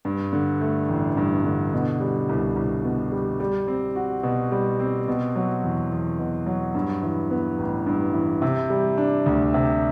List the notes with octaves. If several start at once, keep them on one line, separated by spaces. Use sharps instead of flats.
G2
D3
A3
A1
G2
D3
B2
G3
C2
C2
B2
G3
G3
C4
F#4
B2
G3
C4
B2
F#3
E2
E2
B2
F#3
G2
E3
B3
A1
G2
E3
C3
G3
D4
D2
C3